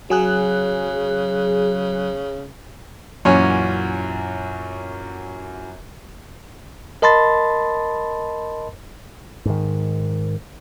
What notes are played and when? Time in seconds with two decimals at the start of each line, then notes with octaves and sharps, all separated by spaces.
0.10 C#3 F#3 G#4 F#6
3.25 F#2 A#2 E3 C#4 F#4 C#5
7.02 A#4 D#5 A5 B5 C6 A6
9.45 G#2 D#3